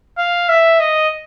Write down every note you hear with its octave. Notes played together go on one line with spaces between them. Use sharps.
F5
E5
D#5